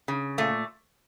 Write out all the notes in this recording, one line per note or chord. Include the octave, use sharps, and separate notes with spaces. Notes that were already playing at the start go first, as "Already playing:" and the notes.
C#3
A#2 A3